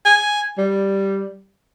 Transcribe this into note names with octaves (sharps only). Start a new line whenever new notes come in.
G#5
G3